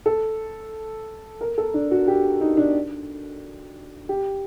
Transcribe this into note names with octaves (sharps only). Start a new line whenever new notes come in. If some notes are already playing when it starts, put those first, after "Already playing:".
A4
A#4
A4
D4
F#4
G4
D#4
D4
G4